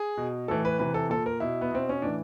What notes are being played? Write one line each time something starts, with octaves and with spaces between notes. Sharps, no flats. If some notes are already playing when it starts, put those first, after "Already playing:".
Already playing: G#4
B2
A2 E3 A4
B4
C3 E3 B4
A4
A#2 A4
A#4
B2 E4
B3
B2 C4
C#4
A2 E3 D4